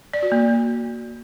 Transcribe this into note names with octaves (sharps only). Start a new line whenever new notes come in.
D5
F#4
A#3